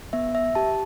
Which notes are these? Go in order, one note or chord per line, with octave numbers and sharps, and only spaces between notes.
B3 E5
E5
G4 A5